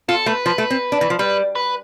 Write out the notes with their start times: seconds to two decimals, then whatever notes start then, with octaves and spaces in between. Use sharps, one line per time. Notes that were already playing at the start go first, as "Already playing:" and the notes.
0.09 F4 A4
0.26 A3 B4
0.46 F3
0.58 A3
0.70 C4
0.92 D4
1.01 E3
1.10 F3
1.19 G3 B4
1.55 B4